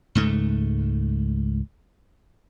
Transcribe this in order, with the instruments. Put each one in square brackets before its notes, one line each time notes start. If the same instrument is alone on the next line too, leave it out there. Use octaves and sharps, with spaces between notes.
[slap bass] C#2 G#2 A3